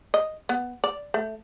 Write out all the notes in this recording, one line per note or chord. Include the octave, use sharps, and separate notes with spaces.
D#5
B3
D5
A3